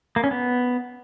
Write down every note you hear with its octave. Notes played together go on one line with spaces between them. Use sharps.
A#3
C#4
B3